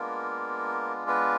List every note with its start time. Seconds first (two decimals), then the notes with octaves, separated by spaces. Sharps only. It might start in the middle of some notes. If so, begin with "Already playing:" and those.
Already playing: G#3 A#3 B3 D4 F4 A#4
1.08 B3 B4